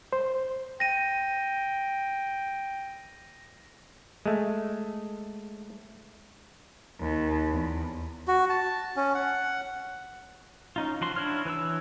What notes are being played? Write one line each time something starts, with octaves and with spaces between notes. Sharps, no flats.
C5
G5 A#6 D#7
G#3 A3
D#2
E2
F#4
A5
C#4
F#5
C#4 D#4 F4
F3 F#4 C6
D4 E4 F#4 C#5 F6
E3 B4 C#5 E6